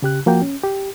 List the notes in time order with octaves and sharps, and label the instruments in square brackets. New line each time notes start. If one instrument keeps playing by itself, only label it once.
[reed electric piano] C#3 G4 F#6
F3 A#3 F#4 G5
C#4
G4